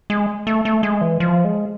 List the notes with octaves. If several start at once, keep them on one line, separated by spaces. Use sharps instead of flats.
G#3
A3
A3
G#3
E3
F3
G#3